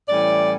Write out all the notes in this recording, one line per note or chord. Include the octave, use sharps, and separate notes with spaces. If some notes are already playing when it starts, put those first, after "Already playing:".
A2 E3 G3 C#4 D5